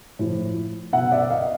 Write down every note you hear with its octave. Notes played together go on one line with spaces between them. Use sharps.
A2 F3
B2 E5 F#5
D5 E5
D#5 F5